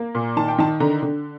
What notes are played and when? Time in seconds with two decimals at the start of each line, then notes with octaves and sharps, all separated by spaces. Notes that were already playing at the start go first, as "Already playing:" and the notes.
Already playing: A#3
0.15 A#2
0.36 D#3 A5
0.48 G5
0.58 D#3 A5
0.80 D3 A#5
1.03 D3